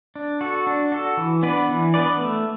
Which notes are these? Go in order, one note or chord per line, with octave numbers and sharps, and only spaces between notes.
D4
F#4 A4
D4
F#4 A4
E3
B3 D4 B4 D5
E3
B3 D4 B4 D5
A3